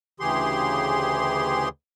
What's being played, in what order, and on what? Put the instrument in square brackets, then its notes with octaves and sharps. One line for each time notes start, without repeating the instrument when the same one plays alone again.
[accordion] D2 C#3 E3 G4 G#4 C6